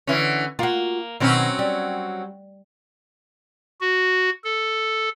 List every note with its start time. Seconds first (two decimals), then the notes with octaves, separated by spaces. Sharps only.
0.07 D3 E3 C#4
0.59 A#3 F4 F#4
1.20 B2 D#3 F#3 C4 C#4
1.59 G3
3.81 F#4
4.44 A4